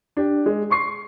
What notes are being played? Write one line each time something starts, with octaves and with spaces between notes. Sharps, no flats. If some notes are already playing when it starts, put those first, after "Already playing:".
D4 G4
G#3
C6 C#6 C7